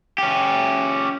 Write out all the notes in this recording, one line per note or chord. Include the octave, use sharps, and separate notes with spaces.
C#4 G4